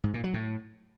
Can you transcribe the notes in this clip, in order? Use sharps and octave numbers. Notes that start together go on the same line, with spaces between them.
G#2
A#2
F#3
A2